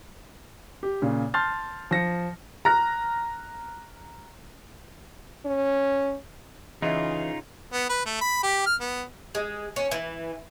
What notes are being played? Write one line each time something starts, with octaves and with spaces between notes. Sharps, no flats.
G4
A#2 C#3
A5 C6 F6 G6 A6
F3 A#6 C#7
A#5 F6 F#6 A#6
C#4
C#3 E3 D#4 F4 D#5 E5
B3
B4
A3
B5
G4
F6
B3
G#3
C#4
E3